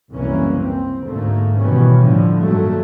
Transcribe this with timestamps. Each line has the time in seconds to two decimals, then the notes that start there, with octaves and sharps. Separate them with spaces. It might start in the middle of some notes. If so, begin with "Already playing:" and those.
0.11 F#1 C2 E3 A#3 C#4
0.60 C4
1.04 D2 G#2 A3 A#3
1.58 B2 D#3 E3 G3 B3 C#4
2.03 A2 D3 F3
2.38 G2 A#2 D#3 F#3 A3